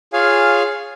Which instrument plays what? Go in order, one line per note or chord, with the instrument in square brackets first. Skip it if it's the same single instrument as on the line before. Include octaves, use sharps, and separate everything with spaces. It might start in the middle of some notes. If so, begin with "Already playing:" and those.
[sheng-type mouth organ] F4 G#4 C#5 F5 G#5